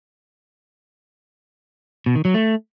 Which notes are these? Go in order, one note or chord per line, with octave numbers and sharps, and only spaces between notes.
B2
D#3
F#3
A3